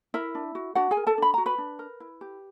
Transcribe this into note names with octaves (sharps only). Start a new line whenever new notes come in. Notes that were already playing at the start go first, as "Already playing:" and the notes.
E4 A#4 E5
D4
F#4
D4 F#4 F#5
G#4 G#5
A#4
A4 A5
D4 B5
F#4 A#5
B4 B5
D4
A#4
E4
G4